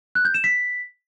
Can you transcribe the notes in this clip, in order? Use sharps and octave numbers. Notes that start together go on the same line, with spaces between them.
F#6
G6
E7
B6